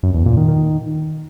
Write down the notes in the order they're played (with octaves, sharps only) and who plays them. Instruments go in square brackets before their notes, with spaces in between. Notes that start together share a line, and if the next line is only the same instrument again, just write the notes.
[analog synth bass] F#2
E2
A#2
D#3
D#3